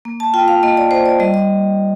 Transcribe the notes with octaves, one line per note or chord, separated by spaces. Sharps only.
A#3
A5
F4 G5
F5
A#3 D#5
D5
A#3 C5
D5
G3 D#5
D#5